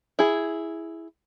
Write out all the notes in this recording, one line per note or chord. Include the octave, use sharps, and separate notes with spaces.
E4 G#4